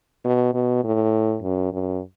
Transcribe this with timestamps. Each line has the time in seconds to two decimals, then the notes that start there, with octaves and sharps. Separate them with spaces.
0.25 B2
0.54 B2
0.84 A2
1.43 F#2
1.73 F#2